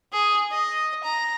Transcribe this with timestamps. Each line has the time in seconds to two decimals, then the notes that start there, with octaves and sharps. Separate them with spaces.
0.13 G#4
0.51 D#5
1.04 A#5